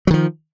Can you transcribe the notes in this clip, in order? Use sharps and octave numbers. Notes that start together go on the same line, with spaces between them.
D#3 F3 F#3